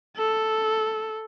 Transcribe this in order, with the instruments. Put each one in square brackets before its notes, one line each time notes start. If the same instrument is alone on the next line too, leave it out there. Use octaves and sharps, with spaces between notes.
[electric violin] A4